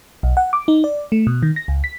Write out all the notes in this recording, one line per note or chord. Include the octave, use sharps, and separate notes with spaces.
B1
F#5
D6
D#4
D5
A3
B2
D#3
A#6
C#2
B6